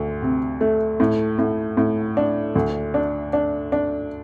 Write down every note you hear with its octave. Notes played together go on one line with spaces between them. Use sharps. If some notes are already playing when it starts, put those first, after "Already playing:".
Already playing: D2
C3
A3
A2
A2
A2
D4
D2
D4
D4
D4